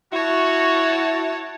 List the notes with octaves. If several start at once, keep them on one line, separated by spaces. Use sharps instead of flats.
E4 F#4 C#5 A5